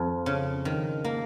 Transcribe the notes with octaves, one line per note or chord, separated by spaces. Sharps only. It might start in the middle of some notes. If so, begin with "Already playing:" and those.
Already playing: F2
C#3
D#3
A#3